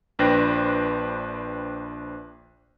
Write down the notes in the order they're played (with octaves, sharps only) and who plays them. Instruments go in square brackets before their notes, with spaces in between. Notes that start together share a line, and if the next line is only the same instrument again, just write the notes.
[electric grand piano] A#1 D4 B4 C5 G5 A#6